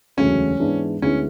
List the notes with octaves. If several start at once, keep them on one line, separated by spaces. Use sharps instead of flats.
E1 D2 C#3 F#3 A3 C#4
G#2 E3 B3 D4 G#4
D2 D3 G#3 B3 C#4 E4